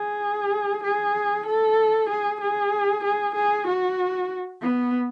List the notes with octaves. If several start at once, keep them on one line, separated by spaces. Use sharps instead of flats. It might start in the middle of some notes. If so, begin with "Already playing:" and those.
Already playing: G#4
G#4
A4
G#4
G#4
G#4
G#4
F#4
B3